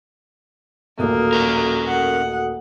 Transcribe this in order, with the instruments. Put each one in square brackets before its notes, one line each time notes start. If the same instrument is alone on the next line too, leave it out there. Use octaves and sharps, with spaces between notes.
[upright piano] D#1 A1 [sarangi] A#3 [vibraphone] F#4 A4 D#6
[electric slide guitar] C#4 A#4
[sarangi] F#5